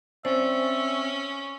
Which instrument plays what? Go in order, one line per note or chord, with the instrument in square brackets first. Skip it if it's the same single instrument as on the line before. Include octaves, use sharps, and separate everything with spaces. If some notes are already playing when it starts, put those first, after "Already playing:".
[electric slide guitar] C4 D5 [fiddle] C#4 [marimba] C5 [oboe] E5